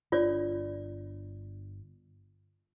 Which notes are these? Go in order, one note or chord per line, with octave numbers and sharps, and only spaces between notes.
G1 D4 F4 C#5 D5